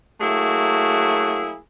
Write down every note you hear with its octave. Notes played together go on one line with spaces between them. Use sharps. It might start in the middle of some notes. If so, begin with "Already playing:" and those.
F#3 A3 A#3 E4 F#4 G#4